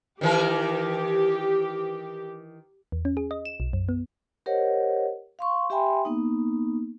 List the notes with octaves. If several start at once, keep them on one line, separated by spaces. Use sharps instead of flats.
D#3 E3 G4 A#4
E2
C#4
G#4
D#5
E7
B1
F#2
B3
G4 A#4 C5 C#5 D#5 F#5
F5 C6 C#6
G4 E5 G5 G#5 B5 C6
A#3 B3 D#4